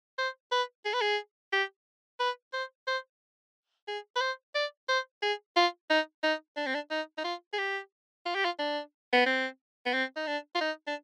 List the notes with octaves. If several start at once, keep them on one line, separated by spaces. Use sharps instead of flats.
C5
B4
G#4
B4
G#4
G4
B4
C5
C5
G#4
B4
C5
D5
C5
G#4
F4
D#4
D#4
D4
C4
D4
D#4
D#4
F4
G#4
G4
F4
G4
F4
D4
B3
C4
B3
C4
D#4
D4
F4
D#4
D4